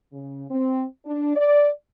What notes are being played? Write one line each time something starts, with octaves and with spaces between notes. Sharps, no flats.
C#3
C4
D4
D5